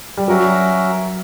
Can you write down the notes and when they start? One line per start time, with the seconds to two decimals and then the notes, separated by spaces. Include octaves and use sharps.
0.17 G3
0.27 F#3 C#4 F#4 A#4 E5